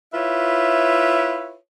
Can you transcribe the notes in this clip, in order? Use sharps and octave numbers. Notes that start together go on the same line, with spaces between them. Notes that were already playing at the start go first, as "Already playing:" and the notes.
E4 F4 B4 C#5 E5